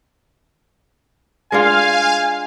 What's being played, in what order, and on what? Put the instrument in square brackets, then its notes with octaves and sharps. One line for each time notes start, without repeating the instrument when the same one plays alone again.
[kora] G#3 D4 F4 [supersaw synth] F5 [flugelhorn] G#5